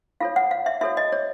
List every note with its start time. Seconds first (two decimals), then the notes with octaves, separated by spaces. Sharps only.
0.20 F4 A4 C#5 F5
0.36 F#5
0.51 F5
0.66 E5
0.81 F#4 A4 C#5 E5
0.97 D#5
1.12 C#5